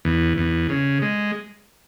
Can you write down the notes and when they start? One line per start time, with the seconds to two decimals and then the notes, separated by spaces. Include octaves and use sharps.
0.05 E2
0.38 E2
0.69 C#3
1.02 G#3